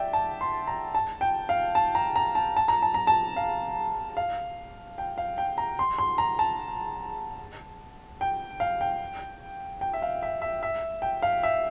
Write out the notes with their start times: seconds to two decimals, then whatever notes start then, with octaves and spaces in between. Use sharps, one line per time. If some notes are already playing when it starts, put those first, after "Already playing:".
Already playing: D5 E5 G5
0.13 A5
0.41 C6
0.67 A#5
0.95 A5
1.21 G5
1.49 F5
1.75 A5
1.95 A#5
2.16 A#5
2.35 A5
2.57 A5
2.68 A#5
2.82 A5
2.94 A#5
3.07 A5
3.36 F5
4.17 F5
4.98 G5
5.18 F5
5.38 G5
5.58 A#5
5.79 C6
5.98 C6
6.18 A#5
6.39 A5
8.21 G5
8.60 F5
8.81 G5
9.81 G5
9.93 E5
10.02 F5
10.22 E5
10.42 E5
10.63 E5
11.02 G5
11.22 F5
11.43 E5